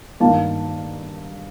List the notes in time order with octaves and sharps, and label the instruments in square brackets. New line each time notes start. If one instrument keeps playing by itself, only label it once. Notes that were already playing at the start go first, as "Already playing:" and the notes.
[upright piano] G2 D#3 A#3 F5 A5